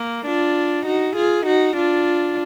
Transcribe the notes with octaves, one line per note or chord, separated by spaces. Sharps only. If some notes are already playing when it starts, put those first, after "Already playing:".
Already playing: A#3
D4 F4
D#4 F#4
F4 G#4
D#4 F#4
D4 F4